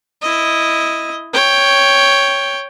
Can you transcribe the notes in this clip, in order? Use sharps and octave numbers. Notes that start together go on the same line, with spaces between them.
E4 D#5
C#5 G5